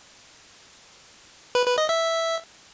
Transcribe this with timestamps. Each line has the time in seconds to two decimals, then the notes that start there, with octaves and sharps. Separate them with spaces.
1.55 B4
1.66 B4
1.78 D#5
1.89 E5